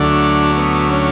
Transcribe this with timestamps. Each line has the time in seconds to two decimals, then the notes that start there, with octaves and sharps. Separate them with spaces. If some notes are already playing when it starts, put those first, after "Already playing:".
Already playing: D2 D3 F#3 A3 D4
0.58 B3
0.91 C#4